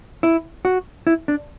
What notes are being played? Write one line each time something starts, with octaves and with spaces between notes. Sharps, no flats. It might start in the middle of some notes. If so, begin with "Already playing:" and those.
E4
F#4
E4
D4